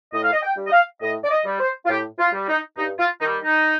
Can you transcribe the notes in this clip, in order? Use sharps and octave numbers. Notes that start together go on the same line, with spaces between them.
A2 D#5
F5
D#5
G5
G3
D#5
F5
A2 D#5
D5
D#5
G3
C5
F4
A2 G4
F4
G3
D#4
G2 D#4
F4
D#3 G3 D#4
D#4